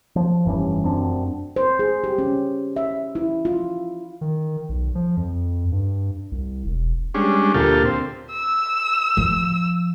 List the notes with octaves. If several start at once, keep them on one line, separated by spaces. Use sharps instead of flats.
F3
F1 G2 E3 C#4
F1 F#2 C4 D4
C5
G#4
G4
C#4
E5
E4
F4
D#3
B1
F3
F2
G2
C2
E1
G3 G#3 C#4 D4
D2 A#2 F4 G4 A4
C4
E6
F3